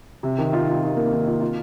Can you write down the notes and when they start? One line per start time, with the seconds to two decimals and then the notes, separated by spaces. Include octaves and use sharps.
0.23 C3
0.38 D#3
0.53 F4
0.68 F4
0.83 D#3
0.97 A#3
1.12 D#3
1.26 F4
1.41 F4